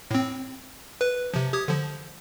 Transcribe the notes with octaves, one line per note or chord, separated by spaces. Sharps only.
A2 C4
B4
C3 F3
G4 D#6 G#6
D3 F3